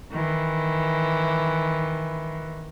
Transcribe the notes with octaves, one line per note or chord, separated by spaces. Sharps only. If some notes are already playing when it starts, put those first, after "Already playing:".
D#3 E3